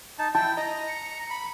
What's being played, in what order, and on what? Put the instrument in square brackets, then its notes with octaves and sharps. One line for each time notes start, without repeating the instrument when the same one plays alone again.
[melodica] D#4 A5
[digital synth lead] E4 [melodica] G5 [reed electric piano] A5
[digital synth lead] D#5 [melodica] A#5
[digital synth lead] C#7
[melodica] B5